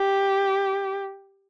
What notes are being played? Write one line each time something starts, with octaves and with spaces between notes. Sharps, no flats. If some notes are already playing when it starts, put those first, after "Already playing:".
Already playing: G4